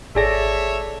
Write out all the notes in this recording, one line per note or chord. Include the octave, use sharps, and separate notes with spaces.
G#1 G#4 A4 C#5 D5 E5 A5 A#6